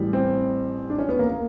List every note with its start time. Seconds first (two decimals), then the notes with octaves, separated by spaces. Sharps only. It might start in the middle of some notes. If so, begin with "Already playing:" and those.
Already playing: A1 A2 E3 G3
0.13 C4
0.90 D4
0.98 C#4
1.09 B3
1.19 A#3
1.30 A#3